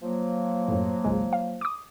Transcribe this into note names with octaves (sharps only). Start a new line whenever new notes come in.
F3 F#3 A#3
F#2 A2
G#1 C#2 G#3
F5
D6 D#6